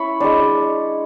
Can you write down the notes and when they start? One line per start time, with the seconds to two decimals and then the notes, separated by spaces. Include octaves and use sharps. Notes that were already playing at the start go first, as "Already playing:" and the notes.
Already playing: C#4 E4 B5 C#6
0.20 G#3 D4